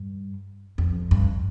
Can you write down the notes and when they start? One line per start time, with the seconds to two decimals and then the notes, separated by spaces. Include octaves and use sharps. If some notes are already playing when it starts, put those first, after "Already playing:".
Already playing: G2
0.78 F2
1.11 G2